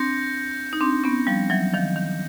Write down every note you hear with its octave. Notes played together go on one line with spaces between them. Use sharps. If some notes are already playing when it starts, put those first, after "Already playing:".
Already playing: C4 D4 G6 A#6 C#7
D#4
C4 D4
B3 C#4
F3 G3
E3 F#3
D#3 F3
D#3